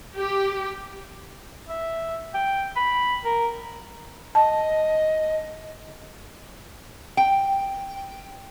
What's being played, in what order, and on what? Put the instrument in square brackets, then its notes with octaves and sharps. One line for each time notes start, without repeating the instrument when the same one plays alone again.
[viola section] G4
[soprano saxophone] E5
G5
B5
A#4
[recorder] D#5 [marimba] A5
[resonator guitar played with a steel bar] G5